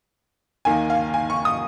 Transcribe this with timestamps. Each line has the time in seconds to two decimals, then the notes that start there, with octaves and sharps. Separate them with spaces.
0.65 D#2 D#3 A#3 G#5
0.90 F5
1.14 G#5
1.30 C#6
1.45 D#6